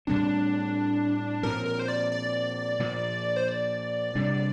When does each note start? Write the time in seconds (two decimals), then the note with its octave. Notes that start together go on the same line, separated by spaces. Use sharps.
0.07 A2 G3 C4 D4
1.43 A#2 F3 C4 A#4
1.66 A#4
1.79 C5
1.88 D5
2.12 D5
2.80 A#2 F3 A#3
3.36 C5
3.48 D5
4.15 C3 G3 D4